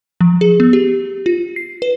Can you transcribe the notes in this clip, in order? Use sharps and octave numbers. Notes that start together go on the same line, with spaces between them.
F3
G#4
B3
G4
F4
C7
B4